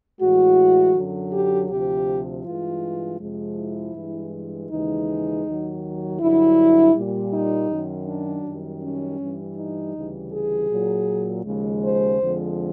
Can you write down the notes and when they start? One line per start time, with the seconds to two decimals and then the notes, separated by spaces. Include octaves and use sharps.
0.20 A2 E3 G#3 F#4
0.96 F#2 D3 F#3
1.33 G4
1.70 D2 C3 F3 G4
2.45 G2 E3 G#3 F4
3.20 F2 C3 F3 G#3
3.58 E4
3.95 G2 E3 G#3
4.70 D#2 C#3 E3 G#3 D#4
5.45 D#2 D#3 F#3
6.20 G2 D3 F#3 E4
6.95 A#2 G3
7.33 D#4
7.70 F#2 D#3 F#3
8.07 D4
8.45 F#2 D#3 G3
8.82 C#4
9.19 G2 E3 G3
9.57 D#4
9.95 D2 C#3 E3 G3
10.32 G#4
10.70 A#2 F#3
11.45 D#2 C#3 F3 G#3
11.83 C5
12.19 F2 D3 F3 G#3